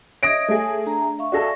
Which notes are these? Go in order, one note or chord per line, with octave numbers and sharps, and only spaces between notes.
C#5 D#5 E5 D#6 G#6 A#6 D7
A3 G#4 A4 G#5
D4 A#5
E5 F5 C#6
F#4 G#4 A4 D5 A#6